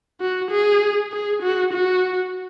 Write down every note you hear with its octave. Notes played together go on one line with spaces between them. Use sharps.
F#4
G#4
G#4
F#4
F#4